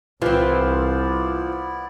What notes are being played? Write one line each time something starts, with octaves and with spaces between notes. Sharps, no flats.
C2 E3 B3 C4 E4 F4 C5 D5